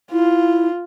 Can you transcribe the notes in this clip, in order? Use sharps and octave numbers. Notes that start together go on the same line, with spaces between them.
E4 F4